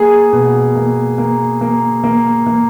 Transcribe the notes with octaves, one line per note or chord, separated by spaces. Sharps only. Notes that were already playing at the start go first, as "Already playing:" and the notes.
Already playing: A#3 G#4
B2
A#3
A#3
A#3
A#3
A#3